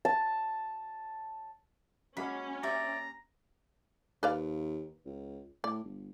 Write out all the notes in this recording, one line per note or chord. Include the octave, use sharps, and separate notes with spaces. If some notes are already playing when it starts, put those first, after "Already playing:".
A5
F#3 G#3 A#3 C#4 B5
G4 D5 E5 A#5
D#2 B4 D5 F5
C#2
A2 D5
G1